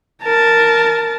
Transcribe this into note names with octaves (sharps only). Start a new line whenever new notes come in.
A#4 A5